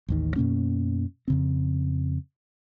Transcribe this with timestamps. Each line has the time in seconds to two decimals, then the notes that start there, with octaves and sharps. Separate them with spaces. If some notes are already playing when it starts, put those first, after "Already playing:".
0.08 A1 D#2 D#3
0.36 F#2 B2 A#3 C#4
1.28 F2 C#3 C4